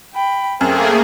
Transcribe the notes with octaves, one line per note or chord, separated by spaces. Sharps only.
G5 B5
F#2 A3 A#3 C4 G#4